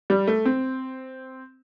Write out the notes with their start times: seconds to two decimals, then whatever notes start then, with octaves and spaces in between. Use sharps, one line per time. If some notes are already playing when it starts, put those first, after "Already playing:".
0.10 G3
0.28 A3
0.45 C4